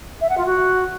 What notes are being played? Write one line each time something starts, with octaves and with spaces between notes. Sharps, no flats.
E5
F#5
F4
F#4